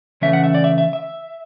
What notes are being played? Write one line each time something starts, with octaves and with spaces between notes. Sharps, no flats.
C#3 E3 A3 C#4 E5
F#5
E5
D5
E5
E5
E5